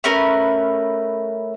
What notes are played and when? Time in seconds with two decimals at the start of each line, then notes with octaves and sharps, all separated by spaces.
0.04 A3 C#4 A#4 B4